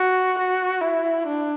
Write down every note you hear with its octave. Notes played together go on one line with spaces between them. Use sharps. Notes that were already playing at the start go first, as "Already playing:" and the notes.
Already playing: F#4
F#4
E4
D4